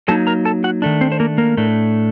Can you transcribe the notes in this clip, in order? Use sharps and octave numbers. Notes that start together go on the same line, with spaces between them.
F#3 A#3 D#4 A4 A5
A#4 A#5
A4 A5
F#4 F#5
D#3 A3 D4
C4 C5
C5
A#3 A#4
A#3 A#4
A2 A3 D4